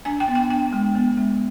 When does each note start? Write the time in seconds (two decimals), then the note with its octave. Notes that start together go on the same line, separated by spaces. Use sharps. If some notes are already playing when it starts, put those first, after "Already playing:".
0.05 D4 G#5
0.20 G5
0.28 B3
0.35 G5
0.50 D4 G5
0.73 G#3
0.95 B3
1.17 G#3